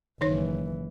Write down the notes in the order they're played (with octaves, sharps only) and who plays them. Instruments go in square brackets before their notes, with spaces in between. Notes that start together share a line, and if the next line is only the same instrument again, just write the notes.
[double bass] F#1 E3 [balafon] D#3 D#4 C#5